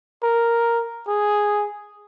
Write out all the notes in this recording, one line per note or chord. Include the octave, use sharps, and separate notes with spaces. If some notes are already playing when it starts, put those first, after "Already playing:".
A#4
G#4